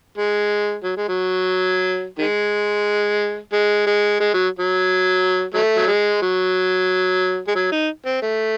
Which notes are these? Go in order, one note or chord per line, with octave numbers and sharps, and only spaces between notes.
G#3
F#3
G#3
F#3
D#3 G#3
G#3
G#3
G#3
F#3
F#3
F#3 A3
F#3
G#3
F#3
G#3
F#3
D#4
C4
A3